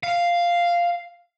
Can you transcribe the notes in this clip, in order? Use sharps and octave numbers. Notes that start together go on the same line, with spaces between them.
F5